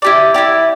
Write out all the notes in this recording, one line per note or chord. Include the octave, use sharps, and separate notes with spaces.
E4 G4 D5
E4 G4 D5